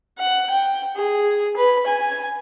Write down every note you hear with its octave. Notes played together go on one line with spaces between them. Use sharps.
F#5
G5
G#4
B4
G#5